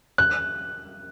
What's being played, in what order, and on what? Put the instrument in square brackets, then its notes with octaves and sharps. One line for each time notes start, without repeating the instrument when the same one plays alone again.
[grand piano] F#6